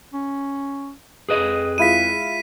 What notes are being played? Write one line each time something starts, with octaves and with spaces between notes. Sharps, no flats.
C#4
F2 G#4 B4 D#5
G#3 E4 F4 B6 D#7